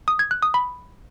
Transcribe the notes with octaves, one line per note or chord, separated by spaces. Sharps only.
D#6
G#6
F#6
D#6
B5